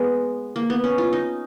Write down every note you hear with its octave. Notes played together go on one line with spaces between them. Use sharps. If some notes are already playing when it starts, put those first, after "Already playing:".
Already playing: G#3 B3
A#3
B3
C#4
F4
D#4